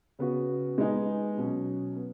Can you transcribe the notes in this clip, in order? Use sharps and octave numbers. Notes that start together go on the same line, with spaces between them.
C#3 B3 F#4
G#3 B3 D#4 G#4
B2 F#3 C#4
B3